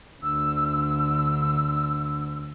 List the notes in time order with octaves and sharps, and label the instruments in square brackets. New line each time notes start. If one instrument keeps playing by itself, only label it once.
[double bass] D2 D3 [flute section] E6